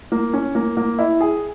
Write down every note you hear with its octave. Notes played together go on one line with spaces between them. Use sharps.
A#3
C#4
A#3
A#3
E4
G#4